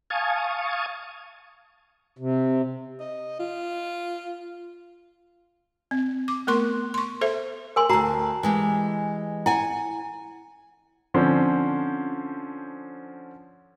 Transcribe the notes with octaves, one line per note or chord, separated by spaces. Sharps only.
F5 G#5 A5 C#6 D#6
C3
D#5
F4
C4
D6
A3 B3 A#4 C6 C#6
C6 C#6
A4 C5 E5
A#4 G#5 C6
D2 F#4 A5 A#5
E3 G#3 G4
E4 F#5 G#5
D3 F3 C4 C#4 C5